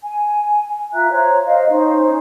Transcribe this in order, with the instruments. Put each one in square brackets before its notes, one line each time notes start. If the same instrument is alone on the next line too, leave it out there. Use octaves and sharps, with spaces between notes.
[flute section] G#5
F4 E5 A#5 F#6
C5 C#5 A#5
C5 D#5 F5
C#4 D#4 C5